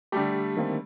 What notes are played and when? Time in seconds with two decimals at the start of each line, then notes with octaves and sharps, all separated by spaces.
0.12 D3 G3 A3 G4
0.57 D#3 A#3 C4